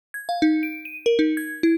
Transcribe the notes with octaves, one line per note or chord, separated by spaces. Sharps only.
G#6
F5
D#4
D7
D#7
A#4
D#4
G#6
E4